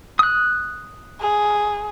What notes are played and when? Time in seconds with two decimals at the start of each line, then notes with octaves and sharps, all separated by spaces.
0.19 D#6 F#6
1.21 G#4